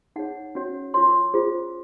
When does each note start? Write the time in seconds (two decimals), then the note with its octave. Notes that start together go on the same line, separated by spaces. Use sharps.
0.16 D#4 G#4 C#5 F#5
0.55 C#4 F#4 C#5
0.94 F4 A#4 C#5 C6
1.34 F4 G#4 C5